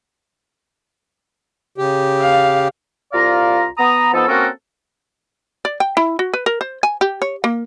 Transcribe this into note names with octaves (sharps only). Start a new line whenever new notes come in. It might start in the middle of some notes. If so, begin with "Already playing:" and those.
C#3 G4
F5
C2 F4 D5 F5 A#5
B3 A#5 D#6
F3 B3 D#4 A4
A#3 C4 C#4 F#4 A4 A#4
D5
G5
E4
F#4
B4
A#4
C5
G#5
G4
C#5
A#3